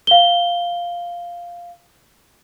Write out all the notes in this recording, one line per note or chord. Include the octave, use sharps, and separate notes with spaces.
F5 G7